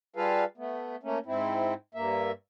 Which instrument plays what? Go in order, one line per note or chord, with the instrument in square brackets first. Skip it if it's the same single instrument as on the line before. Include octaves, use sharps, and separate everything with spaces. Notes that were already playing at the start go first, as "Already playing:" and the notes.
[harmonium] G3 F4 G#4 A4 B4 F5
A3 B3
A3 A#3 C#4
G#2 C4 E4
G2 A#3 E5